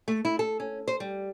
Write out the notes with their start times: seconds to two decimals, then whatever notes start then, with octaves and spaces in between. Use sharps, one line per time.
0.08 A3
0.25 E4
0.39 A4
0.60 C#4
0.88 C5
1.00 G3